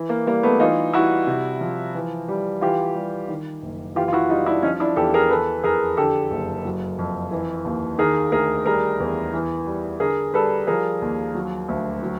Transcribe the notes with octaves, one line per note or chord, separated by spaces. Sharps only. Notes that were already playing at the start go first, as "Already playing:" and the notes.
Already playing: E3
A#3
G3 A#3
A3 B3
E3 D#4 F4
G3 E4 F#4
C3
F3
E3
G3
E3 F4 G4
G3
D#3
F#1
E3 F4 G4
F4
E4 F#4
G3 D#4 F4
D4 E4
F3 C#4 D#4
D4 E4
E2 G4 A4
G#4 A#4
E3 A4 B4
F2 G#4 A#4
D3 G4 A4
F#1
F#3
F2
E3
D#2
D#3 G#4 A#4
D2 G#4 A#4
G3 G#4 A#4
E2
E3
G3
D3 G#4 A#4
G3 A4 B4
F3 G#4 A#4
D#2
F#3
D2
F#3